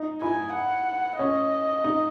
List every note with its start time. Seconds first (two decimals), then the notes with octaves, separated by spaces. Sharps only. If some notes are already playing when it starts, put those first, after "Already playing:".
Already playing: D#4
0.22 E4 G#5
0.54 F#5
1.19 C#4 D#5
1.84 D#4